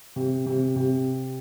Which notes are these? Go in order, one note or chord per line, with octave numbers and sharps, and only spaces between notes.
C3
C3
C3